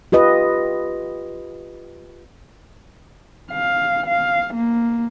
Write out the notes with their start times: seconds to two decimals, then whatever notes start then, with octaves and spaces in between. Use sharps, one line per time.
0.12 F4 G4 B4 D#5
3.51 F5
4.07 F5
4.54 A#3